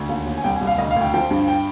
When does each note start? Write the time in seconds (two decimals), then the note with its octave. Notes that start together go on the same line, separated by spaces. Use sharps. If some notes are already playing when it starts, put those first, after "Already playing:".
Already playing: D2
0.09 D#2
0.26 D#2
0.37 G#5
0.44 C2 G5
0.56 G#5
0.61 C2
0.67 F5
0.78 D2 D#5
0.91 F5
0.96 D2
1.01 G5
1.13 F3 G5
1.31 G2
1.48 G5